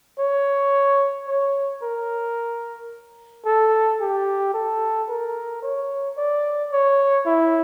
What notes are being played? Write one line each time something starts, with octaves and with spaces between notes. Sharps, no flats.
C#5
C#5
A#4
A4
G4
A4
A#4
C#5
D5
C#5
E4